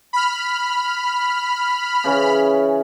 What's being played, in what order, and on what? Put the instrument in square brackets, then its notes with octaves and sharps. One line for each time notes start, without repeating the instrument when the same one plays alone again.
[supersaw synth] B5 F6
[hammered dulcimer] C#3 E3 C#4